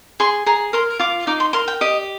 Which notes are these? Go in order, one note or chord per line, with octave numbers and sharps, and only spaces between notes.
G#4 C6
G#4 A#5
A#4 C6
F4 D6
D#4 D6
C6
A#4 C6
G5
G4 D#5